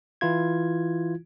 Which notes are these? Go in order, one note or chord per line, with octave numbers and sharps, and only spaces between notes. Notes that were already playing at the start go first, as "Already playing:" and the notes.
E3 E4 F4 G#6